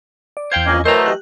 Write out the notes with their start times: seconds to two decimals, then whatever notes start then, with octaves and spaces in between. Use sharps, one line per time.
0.37 D5
0.52 E2 C5 F5 G5 G#6
0.66 F2 A#3 C#4 D#5
0.85 E3 F#3 A3 A#4 C5 D#5 A#5
1.06 G4 F#6